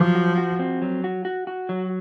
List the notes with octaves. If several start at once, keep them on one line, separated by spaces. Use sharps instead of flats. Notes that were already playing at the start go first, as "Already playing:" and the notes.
Already playing: F3 F#3
F#4
F#4
C4
F#3
F#4
F#4
F#4
F#3